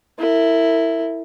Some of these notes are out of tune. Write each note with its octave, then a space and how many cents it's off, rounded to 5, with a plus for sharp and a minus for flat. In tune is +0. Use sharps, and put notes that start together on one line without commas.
E4 +0 A#4 -40